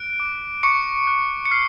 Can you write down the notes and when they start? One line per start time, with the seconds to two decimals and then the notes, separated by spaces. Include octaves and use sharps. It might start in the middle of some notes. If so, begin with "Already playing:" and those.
Already playing: F#6 D7
0.20 D6
0.63 C#6 D6 C#7
1.07 F#6
1.45 C#7
1.51 F6 C7